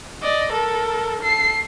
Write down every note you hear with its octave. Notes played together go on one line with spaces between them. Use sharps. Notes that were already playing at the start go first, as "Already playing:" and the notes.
D5 D#5
A4 A#4
A4 C7